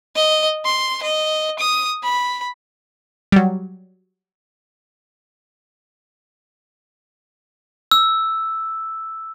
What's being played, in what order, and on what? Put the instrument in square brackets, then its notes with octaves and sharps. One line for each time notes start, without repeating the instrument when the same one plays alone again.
[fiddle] D#5
C6
D#5
D#6
B5
[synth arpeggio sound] F#3 G3
[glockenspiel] E6